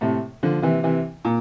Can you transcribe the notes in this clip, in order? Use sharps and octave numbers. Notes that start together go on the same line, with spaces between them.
A2 C3
D3 F3
C3 E3
C3 E3
A#2